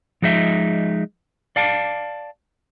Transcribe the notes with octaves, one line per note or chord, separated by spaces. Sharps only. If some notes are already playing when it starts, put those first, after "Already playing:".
F3 G#3 D#4 E5
D5 F5 A5